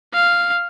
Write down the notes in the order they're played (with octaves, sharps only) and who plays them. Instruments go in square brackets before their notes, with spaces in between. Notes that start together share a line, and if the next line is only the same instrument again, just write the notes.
[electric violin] F5